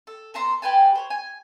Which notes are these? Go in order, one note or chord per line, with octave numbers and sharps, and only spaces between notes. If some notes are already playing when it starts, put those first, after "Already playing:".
A4
B3 A4 A#5 C6
G4 B4 G#5 A5
C5 C#5
G#5